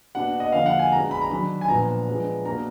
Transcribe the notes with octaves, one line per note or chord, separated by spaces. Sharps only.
B2 A#3 D4 F#5
D#5
D3 F3 A#3 D4 F5
F#5
G#5
B2 G#3 D4 A#5
B5
A#5
D#3 F#3 D4 B5
G#5
A#2 F3 B3 D4 A#5
F3 G#3 B3 D4
B2 A#3 D4 A#5